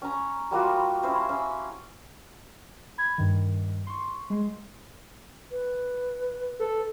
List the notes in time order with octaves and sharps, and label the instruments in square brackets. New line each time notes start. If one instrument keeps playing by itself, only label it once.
[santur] C#4 A#5
G3 A#3 F4 F#4
C#4 E4 C5
C#4 E6
[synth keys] B5 G#6
G2 D#3
C6 C#6
G#3 C6
[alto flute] B4
[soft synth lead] A4